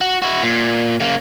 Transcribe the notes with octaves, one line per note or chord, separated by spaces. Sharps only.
F#4
E4 F#4
A#2
C#3 A#3